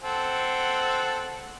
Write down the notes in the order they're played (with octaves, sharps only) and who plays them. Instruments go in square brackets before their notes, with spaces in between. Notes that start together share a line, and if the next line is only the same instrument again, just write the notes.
[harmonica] C4 A4 F#5